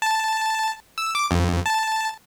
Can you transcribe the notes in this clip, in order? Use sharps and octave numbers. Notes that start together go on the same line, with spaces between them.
A5
E6
D6
F2
A5